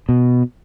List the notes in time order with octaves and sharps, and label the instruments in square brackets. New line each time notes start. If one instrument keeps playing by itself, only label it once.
[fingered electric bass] B2